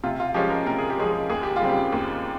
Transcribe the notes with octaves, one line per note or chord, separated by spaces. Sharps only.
C3 F4
F4
F3 G#3 C#4 G4
A#4
C3 A#4
G#4
G4
F3 G#3 C#4 G#4
D#2 G#4
G4
F4
C#3 G3 C4
G4
D#2